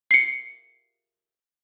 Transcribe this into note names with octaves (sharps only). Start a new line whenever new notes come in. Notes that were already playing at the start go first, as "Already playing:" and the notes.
C7 C#7